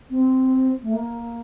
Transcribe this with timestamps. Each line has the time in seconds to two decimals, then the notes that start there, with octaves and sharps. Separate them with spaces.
0.10 C4
0.82 A3
0.93 A#3